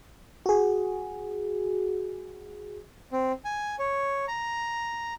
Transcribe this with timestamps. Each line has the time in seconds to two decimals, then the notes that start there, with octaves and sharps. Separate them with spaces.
0.46 F#4 G#4
3.12 C4
3.45 G#5
3.79 C#5
4.28 A#5